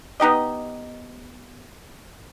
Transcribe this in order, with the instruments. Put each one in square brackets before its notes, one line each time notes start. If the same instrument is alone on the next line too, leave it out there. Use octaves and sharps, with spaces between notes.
[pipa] B3 D#4 G4 D#5